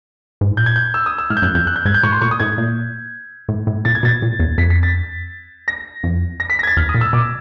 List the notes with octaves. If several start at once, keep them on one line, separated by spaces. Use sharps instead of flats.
G#2
A2
A#2 G6
G#6
G6
E6
D#6
E6
A2 F6
G6
F#2 F#6
F2 G6
F#6
G6
G#2 G#6
G6
A2 C#6
C6
A#2 C#6
D#6
A2 G#6
A#2
A2
A2
A#2 A6
G#6
B2 A6
A#2
E2
F2 B6
B6
A6
A#6
F2
A#6
B6
A#6
G#6
A6
E2 F6
D#6
A#2
E6
B2 D6